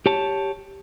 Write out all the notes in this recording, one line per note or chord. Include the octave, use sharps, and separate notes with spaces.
G4 C#5 A5